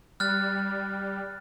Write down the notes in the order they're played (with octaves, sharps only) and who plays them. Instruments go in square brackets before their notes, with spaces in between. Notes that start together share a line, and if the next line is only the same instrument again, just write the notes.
[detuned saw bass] G3 [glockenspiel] F6 F#6 A6